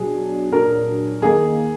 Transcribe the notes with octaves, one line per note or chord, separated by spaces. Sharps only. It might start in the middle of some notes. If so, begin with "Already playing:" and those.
Already playing: B2 F#3 D4 G#4
A#2 F#3 D4 A#4
D#3 A#3 D#4 G#4